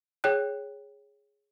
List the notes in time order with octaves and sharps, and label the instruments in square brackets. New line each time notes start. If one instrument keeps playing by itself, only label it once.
[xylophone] G#4 C#5 G5 F#6